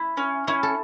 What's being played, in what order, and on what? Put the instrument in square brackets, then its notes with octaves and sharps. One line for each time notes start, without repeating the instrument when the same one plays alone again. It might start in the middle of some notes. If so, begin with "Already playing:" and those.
Already playing: [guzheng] E4
[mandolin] C#4
[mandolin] C#4 [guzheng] E4
[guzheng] A4